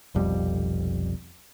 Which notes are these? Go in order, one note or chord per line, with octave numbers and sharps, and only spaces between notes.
F1 B1 F2 G3